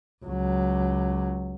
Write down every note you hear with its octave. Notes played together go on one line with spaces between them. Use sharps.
C#2 F#3